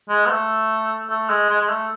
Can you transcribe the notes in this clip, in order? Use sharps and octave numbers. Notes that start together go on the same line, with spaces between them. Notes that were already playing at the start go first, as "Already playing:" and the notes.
G#3
B3
A3
A3
G#3
G#3
G#3
A3